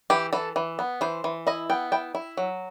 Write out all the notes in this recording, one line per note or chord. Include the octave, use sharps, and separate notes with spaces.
E3 G4
E3 A4
E3
B3
E3 C5
E3
E4 D#5
B3 G5
E4 G5
E4
F#3